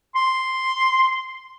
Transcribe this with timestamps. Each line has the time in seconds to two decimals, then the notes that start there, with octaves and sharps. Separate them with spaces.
0.15 C6